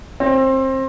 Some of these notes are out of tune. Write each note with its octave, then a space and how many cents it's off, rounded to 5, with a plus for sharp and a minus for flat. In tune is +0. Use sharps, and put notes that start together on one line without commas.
C4 +25